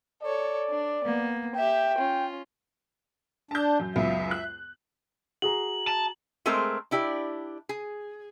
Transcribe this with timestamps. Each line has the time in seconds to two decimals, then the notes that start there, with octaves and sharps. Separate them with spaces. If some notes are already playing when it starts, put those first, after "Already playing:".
0.22 A4 C#5 D5
0.69 D4
1.04 A#3 B3
1.55 G4 E5 G5
1.98 C#4 F4
3.51 D4 A5 G6
3.80 F#2
3.96 C#2 F#2 B3 E5
4.31 F#6
5.42 F#4 G#4 A#5 F#7
5.87 A5
6.46 G#3 A3 C4 G#4 A#4 C5
6.91 D4 E4 G4 D5
7.69 G#4